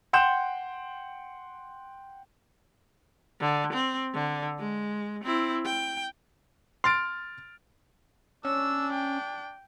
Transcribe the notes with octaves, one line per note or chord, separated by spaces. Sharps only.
F#5 G5 C6 G6 E7
D3
C4
D3
G#3
C4 E4
G5
C6 F6 A6 D7
C#4 D4 E6
G5